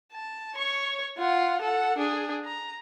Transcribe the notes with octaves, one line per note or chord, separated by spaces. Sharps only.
A5
C#5 C#6
F4 F#5
A4 F#5
D4 G#4
A#5